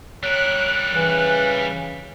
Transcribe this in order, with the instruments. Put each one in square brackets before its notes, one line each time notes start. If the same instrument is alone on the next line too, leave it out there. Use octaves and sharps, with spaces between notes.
[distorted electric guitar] G3 A#4 [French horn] C#5 [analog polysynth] F#6
[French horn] C#3 [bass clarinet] E3